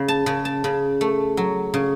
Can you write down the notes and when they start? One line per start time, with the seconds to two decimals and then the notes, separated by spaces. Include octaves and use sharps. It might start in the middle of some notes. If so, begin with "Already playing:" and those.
Already playing: C#3
0.08 A5
0.26 C#3
0.45 A5
0.64 C#3
1.01 A3
1.37 F#3
1.74 C#3